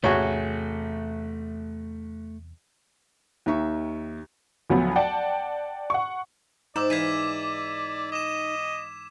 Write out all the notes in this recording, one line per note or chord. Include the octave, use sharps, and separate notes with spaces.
A1 E2 C3 A3 F#4 G#4 C#5
D#2 D#3 E5 C#6
D2 F3 F#3 B3
D5 F#5 G5 A5
F#5 C#6
G#2 D#4 D5 D6 E6 E7
E3 F5 G#6 B6 D#7
D#5 D6 E7